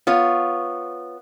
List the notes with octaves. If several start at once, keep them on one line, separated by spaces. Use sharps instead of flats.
B3 F4 C#5